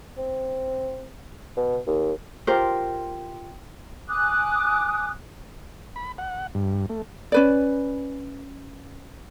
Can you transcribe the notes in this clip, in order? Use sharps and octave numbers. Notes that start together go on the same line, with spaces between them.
C4
B2
D#2
F4 G4 A#4 C5
G#5 D6 D#6 F#6
B5
F#5
G2
A3
C#4 B4 D5